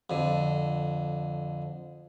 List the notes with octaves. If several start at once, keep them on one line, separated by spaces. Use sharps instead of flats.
F2 D3